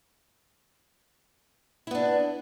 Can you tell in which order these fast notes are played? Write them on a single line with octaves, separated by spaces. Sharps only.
E4 B3 D4